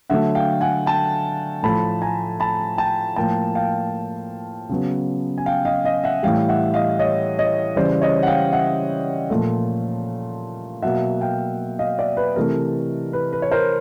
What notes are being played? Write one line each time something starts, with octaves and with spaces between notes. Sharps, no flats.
D3 F#3 A3 E5 F#5
F5 G5
F#5 G#5
G5 A5
A2 F3 A3 A5 B5
G#5 A#5
A5 B5
G5 A5
A2 F3 A#3 G5 A5
F5 G5
C#3 F#3 B3
G#5
F5 G5
D#5 F5
D#5 F5
E5 F#5
A2 E3 G3 F5 G5
E5 F#5
D#5 F5
C#5 D#5
C#5 D#5
C#3 E3 G3 C5 D5
C#5 D#5
F#5
F5 G5
E5 F#5
A#2 F3 A3
B2 F#3 A#3 E5 F#5
F5 G5
D#5 F5
D5 E5
B4
C3 E3 A3 A#4
B4
B4
C#5
A#4 C5